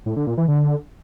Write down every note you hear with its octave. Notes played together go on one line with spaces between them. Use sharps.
A2
D3
A#2
E3
D3